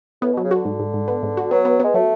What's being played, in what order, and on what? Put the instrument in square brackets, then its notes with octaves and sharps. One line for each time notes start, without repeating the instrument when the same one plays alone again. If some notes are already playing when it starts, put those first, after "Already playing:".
[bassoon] A2 [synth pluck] B3
[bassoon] B2 [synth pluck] F#3
[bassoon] C#3
[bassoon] D3 [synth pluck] F#4
[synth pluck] G#2
G#2
G#2
B3
G#2
F#4
[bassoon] F#3 [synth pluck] B3
[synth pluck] B3
[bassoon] G#3 [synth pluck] B3
[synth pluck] F#3 [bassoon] A3